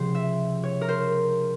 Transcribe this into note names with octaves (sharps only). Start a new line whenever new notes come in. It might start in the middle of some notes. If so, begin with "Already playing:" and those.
Already playing: C#2 C3 F3 C5
E5
C#5
A#4
C5